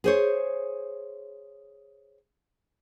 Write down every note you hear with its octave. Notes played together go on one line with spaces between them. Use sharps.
G#4 C5 C#5